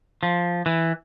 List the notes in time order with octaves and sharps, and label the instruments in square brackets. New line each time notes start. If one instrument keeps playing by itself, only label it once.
[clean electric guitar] F3
E3